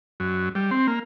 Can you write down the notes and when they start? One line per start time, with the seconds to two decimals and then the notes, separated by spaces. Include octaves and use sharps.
0.20 F#2
0.55 G3
0.71 C4
0.87 A#3